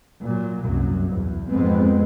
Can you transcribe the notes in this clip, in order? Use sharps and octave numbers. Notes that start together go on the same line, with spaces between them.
A#2 F#3
C2 F#2 A#2 F#3
E2
F2 G#2 G#3 B3 C4